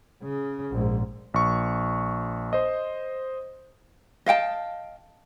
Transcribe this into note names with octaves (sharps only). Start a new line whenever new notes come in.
C#3
A#1 G#2
A#1 C#6
C5 D#5
D#5 F5 G5 A5